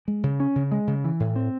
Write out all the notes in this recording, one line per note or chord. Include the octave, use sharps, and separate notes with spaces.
G#3
C#3
C#4
C#3
G#3
C#3
E3
A2
C4